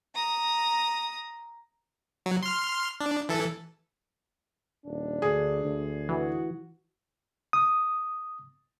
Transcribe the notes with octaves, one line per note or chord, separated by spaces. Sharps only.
A#5 D#6
F#3
C6 F6
D4
E3 A4
D#1 D4
D2 G#4
D2
E3 F#4
D#6